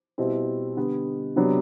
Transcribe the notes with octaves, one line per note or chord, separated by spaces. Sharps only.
B2 G3 C4 E4
D3 G3 B3
C3 F#3 B3 D4